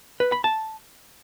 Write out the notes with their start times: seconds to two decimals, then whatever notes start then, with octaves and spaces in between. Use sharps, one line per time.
0.20 B4
0.32 B5
0.44 A5